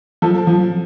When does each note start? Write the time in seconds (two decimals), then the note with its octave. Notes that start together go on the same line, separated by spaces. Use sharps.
0.22 F3 A4
0.47 F3